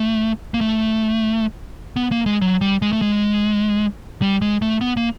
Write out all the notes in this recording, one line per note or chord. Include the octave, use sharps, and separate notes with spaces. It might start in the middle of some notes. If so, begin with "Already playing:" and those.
Already playing: A3
A#3
A3
B3
A#3
G#3
F#3
G3
G#3
A3
G#3
G3
G#3
A3
B3
A#3